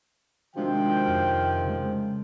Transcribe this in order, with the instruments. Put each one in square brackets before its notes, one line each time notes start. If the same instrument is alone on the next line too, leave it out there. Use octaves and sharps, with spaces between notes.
[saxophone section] C3 D#3 F3 [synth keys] G#3 D4 F#4 [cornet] G5
[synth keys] F2 F6
C#3 G#3